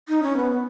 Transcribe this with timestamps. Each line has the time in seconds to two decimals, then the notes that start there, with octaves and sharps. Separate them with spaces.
0.09 D#4
0.23 C#4
0.37 B3
0.50 B3